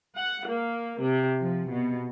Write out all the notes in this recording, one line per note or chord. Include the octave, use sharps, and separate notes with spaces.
F#5
A#3
C3
F3
B2